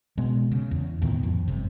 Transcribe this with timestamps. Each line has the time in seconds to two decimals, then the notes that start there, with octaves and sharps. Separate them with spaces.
0.18 B2 G#3 B3
0.52 C#3
0.71 E2
1.02 C#2 A2 D#3 B3
1.23 F2
1.48 G1 C3